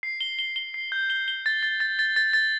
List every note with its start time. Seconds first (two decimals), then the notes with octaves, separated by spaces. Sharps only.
0.03 C7
0.21 G7
0.39 G7
0.56 G7
0.74 C7
0.92 G6
1.10 G7
1.28 G7
1.46 A6
1.63 A6
1.80 A6
1.99 A6
2.16 A6
2.33 A6